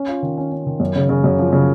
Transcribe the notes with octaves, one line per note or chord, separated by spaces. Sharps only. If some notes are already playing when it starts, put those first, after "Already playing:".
Already playing: C#4
F4
D#3
C#4
C#4
D#3
F#2
C#3
C#3
F#2
F3
C#3